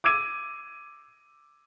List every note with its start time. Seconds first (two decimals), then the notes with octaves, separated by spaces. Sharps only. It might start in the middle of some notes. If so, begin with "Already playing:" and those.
0.04 D6 E6 G#6 D#7